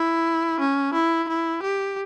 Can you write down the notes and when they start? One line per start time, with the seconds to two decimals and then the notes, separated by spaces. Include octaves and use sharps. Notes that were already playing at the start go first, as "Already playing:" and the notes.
Already playing: E4
0.60 C#4
0.94 E4
1.28 E4
1.62 G4